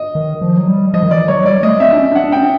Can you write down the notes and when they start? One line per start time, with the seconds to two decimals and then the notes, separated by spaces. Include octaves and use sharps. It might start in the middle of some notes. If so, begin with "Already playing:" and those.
Already playing: D#5
0.15 D#3
0.42 F3
0.58 F#3
0.67 G3
0.94 F3 D#5
1.03 D#3
1.11 E3 D5
1.28 F#3 C#5
1.45 G3 D5
1.63 A3 D#5
1.80 C4 E5
1.93 D4
1.98 C#4
2.12 D4
2.15 F#5
2.24 D4
2.32 C#4 G5